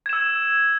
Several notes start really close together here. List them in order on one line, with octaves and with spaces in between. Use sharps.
G#6 E7 E6